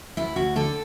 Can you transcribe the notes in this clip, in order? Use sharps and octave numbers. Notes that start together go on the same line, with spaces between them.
D2 E4
D2 F#4
D3 A4